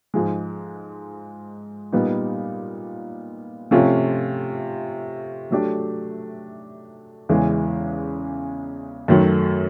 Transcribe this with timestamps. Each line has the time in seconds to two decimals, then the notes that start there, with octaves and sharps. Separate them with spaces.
0.14 G#2 F3 G#3
1.92 A#2 G3 B3 D#4
3.71 C3 F3 A3 C#4 F4
5.51 F#3 A3 D4 G4
7.29 E2 C#3 E3 G#3
9.08 F#2 D#3 F#3 A3